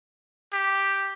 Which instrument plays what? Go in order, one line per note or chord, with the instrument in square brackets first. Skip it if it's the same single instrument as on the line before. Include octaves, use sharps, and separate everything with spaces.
[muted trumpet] G4